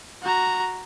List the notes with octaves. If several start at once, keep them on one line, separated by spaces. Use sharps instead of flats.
F#4 A#5